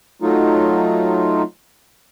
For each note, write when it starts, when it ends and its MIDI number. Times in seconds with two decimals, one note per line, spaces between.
0.22 1.42 54
0.22 1.42 57
0.22 1.42 63
0.22 1.42 65